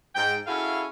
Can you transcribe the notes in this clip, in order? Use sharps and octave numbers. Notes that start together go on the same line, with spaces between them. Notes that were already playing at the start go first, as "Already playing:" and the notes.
G#2 G5
C#4 E4 F#4 G#4 A4 F5